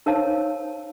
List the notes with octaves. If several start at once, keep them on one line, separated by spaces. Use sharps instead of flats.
D#4 A#4 C5 C#5 F5 A5